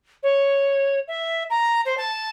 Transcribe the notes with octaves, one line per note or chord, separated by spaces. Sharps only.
C#5
E5
A#5
C5
A5